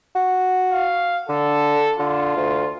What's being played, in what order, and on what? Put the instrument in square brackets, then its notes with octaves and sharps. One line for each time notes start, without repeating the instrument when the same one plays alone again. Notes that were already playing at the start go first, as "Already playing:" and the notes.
[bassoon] F#4
[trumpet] F5
[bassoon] D3 [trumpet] A4
[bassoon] D3 [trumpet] F4
[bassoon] D2